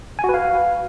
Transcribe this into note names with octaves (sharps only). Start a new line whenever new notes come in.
G#5
F#4
B4
F5